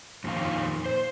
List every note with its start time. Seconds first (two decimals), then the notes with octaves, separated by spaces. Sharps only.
0.24 F2 A#2 D#3 F5
0.86 C5